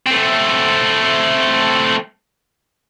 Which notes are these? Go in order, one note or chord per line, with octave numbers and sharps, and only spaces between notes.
A3 C4